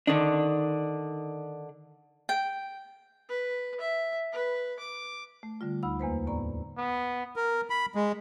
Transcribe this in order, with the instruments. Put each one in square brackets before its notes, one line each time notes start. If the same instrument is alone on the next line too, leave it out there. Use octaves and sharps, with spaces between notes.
[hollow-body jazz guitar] D3 D#3 D4
[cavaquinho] G5
[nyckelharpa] B4
E5
B4
D6
[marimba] A3
D3 G3 F4
D2 D#4 B5 E6
E2 A#3 B4 C5
A2 B3 D5 A#5
[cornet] B3
[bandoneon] A#4
B5
G#3